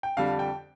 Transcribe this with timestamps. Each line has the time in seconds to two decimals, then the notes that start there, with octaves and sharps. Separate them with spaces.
0.03 G5
0.17 F2 D3 G3 F5
0.39 G5